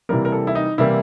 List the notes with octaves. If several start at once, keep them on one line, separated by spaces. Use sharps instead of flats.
C3 E3 G3 A#3 A#4
A#4
A4
E4
D#4
C3 E3 G3 A#3 E4